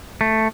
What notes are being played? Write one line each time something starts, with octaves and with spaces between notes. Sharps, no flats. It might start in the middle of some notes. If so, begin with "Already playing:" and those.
A3